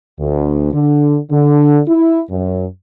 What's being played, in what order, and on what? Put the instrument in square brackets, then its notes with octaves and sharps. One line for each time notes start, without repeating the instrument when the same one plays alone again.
[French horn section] D2
D3
D3
E4
F#2